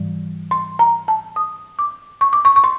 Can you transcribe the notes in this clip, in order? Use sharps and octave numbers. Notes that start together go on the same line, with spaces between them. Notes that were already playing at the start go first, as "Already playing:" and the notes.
Already playing: G#2 E3 G3
C6
A#5
A5
D#6
D6
C#6
D6
C#6
C#6
C6